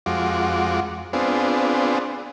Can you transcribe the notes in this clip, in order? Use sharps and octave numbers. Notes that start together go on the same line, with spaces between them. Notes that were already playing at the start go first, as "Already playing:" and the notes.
F2 G#3 F4 F#4 D6
B3 C4 D4 F4 G#4